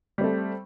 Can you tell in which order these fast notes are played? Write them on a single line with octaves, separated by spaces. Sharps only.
G3 C4 A3